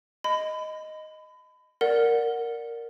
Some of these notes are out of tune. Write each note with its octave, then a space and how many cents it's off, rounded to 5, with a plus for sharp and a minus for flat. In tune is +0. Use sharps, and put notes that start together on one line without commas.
D#5 +0 B5 +30
A#4 -5 D5 +0 F#5 -10